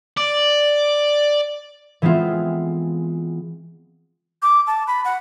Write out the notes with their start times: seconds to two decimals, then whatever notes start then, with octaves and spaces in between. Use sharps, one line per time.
0.17 D5
2.02 E3 G#3 B3 C4 F4
4.42 D6
4.67 A5
4.87 B5
5.05 F#5